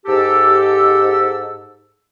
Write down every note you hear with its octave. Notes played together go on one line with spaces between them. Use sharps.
G#2 G4 A4 E6